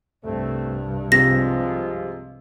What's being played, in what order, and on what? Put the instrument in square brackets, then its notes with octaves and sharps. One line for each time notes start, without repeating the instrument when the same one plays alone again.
[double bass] C2 G2 [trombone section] A3 C4
[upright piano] C3 [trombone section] F3 G#3 F4 [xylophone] A#6